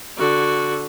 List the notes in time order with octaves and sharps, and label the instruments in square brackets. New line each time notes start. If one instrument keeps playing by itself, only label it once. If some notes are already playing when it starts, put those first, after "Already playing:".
[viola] D3 F#4